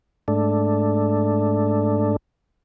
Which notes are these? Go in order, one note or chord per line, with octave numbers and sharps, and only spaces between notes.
G#2 A3 D4